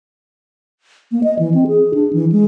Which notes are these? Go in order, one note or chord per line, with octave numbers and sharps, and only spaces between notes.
A#3
D#5
E3
C4
G#4
D4
E3
G#3